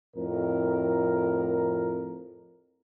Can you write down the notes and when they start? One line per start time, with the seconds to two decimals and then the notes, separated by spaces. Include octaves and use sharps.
0.15 F2 A2 A#4